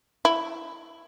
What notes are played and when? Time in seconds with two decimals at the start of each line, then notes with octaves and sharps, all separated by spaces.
0.25 E4